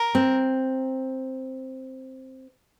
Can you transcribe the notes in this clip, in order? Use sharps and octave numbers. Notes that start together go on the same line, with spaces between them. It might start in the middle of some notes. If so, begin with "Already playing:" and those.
Already playing: A#4
C4